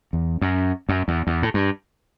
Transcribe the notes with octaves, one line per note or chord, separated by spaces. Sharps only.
E2
F#2
F#2
E2
E2
A2
G2